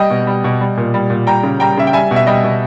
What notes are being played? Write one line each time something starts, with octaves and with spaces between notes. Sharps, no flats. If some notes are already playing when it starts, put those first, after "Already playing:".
Already playing: G3 D#5 G5
B2
G3
B2
G3
A#2
G3
A#2
G3 G5 A#5
C#3
G3 G5 A#5
C#3 E5
G5
G3 E5 G#5
B2
E5
G3 D#5 G5
B2